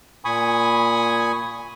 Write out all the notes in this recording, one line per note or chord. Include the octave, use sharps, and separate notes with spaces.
A#2 G#5 B5 C#6 D#6